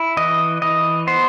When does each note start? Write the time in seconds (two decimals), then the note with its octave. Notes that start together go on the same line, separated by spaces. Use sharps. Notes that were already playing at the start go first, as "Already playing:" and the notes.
Already playing: E4
0.17 E3 D#5
0.62 E3 D#5
1.07 B3 C5